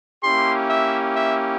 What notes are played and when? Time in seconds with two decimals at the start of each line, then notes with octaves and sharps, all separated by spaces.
0.24 A#3 C#4 E4 G4 C6
0.70 E5
1.16 E5